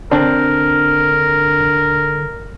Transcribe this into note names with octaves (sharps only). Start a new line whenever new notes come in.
D3 C4 D4 A#4